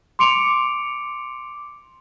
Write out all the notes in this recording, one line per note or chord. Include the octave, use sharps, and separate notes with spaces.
C6 D6 C#7 D7 F7